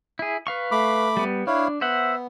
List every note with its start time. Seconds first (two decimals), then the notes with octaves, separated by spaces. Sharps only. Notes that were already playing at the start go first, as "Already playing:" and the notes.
0.19 E4 G#4
0.47 B4 F5 C#6
0.71 A3 B5 D6
1.17 G3 B3
1.47 D4 E4 C#5 F5
1.81 B3 C5 E5 F#5